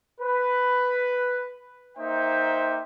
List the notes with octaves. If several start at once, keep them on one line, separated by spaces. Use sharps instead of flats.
B4
A#3 D#4 C5 E5 G5